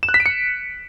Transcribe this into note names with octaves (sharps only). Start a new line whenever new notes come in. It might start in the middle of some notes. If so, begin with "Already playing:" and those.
E7
F#6
B6
D7
C#7